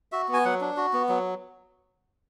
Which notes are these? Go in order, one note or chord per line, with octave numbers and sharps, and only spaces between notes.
F#4 E5
B3 G#5
F#3 F#5
D4
F#4
B3
F#3